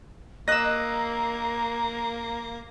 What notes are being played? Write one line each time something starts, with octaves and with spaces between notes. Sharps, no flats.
A#3 D#5 A#5 E6 F#6 A#6